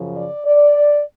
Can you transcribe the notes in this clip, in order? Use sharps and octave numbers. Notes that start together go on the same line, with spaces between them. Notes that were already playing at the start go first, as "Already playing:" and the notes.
Already playing: F#2 C#3 F3
D5
D5